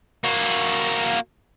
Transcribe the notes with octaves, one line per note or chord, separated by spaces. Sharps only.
A#3 F#4